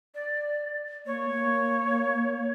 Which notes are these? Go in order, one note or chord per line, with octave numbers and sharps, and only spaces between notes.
D5
A#3 C#5
A#3